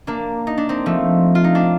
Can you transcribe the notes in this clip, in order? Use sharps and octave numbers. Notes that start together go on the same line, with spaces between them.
A#3 D4
D#4
D4
C4 D#4
F3 A3
F4
D#4
D4